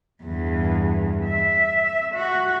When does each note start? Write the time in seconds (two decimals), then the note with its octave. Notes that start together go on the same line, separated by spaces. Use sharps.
0.23 E2 G2
1.25 E5
2.15 F#4